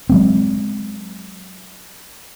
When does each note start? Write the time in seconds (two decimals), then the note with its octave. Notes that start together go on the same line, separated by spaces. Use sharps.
0.09 F#3 G#3 C4